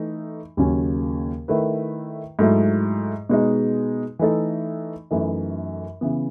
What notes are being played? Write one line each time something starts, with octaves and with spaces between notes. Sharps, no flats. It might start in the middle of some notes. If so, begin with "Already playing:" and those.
Already playing: E3 A3 D#4
D#2 C#3 F#3 C#4
D#3 A3 E4 B4
G#2 F#3 A3 E4
B2 G#3 D#4
E3 A3 D#4 A4
F#2 E3 A3 D#4
C#3 E3 B3